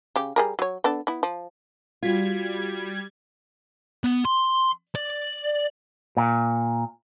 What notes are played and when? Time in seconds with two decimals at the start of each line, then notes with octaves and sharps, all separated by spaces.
0.16 C#3 G4
0.36 G3 G#4 A#4
0.59 F#3 C#5
0.84 B3 D4 A4
1.07 B3 E4
1.23 F3
2.03 G3 F4 F#4 G#6 B6
4.04 B3
4.25 C6
4.95 D5
6.17 A#2